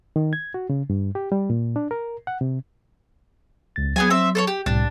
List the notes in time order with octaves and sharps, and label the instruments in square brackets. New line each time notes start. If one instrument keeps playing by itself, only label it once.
[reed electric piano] D#3
G#6
F#4
C#3
G2
G4
G3
A#2
D4
A#4
F#5
C3
[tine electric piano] C#2 A6
[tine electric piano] F#3 [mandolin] B3 G#4 G#5
[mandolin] C4 E5
A4 C5 C#5
G4
[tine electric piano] C2 A2 [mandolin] D4